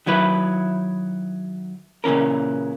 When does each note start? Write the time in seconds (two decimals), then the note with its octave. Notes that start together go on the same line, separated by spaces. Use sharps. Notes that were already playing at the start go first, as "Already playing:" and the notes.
0.06 D#3 F#3 E4 B4
2.04 A#2 C#3 E3 C#4 A#4